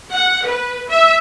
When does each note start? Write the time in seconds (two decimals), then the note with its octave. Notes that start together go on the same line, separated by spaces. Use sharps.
0.13 F#5
0.45 B4
0.89 E5